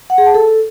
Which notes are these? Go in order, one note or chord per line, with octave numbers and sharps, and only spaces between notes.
F#5
G#4
A5
A4